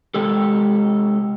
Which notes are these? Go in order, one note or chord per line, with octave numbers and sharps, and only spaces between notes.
C3 G#3 G4 A4